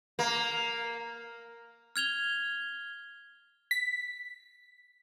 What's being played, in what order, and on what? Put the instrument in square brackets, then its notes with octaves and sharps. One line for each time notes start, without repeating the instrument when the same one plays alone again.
[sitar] A#3
[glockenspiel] F6 G#6 F7 G7
[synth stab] B6